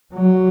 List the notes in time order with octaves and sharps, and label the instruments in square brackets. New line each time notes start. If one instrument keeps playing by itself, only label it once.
[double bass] F#3